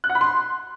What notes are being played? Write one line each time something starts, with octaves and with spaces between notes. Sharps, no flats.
F#6
F#5
B5
C6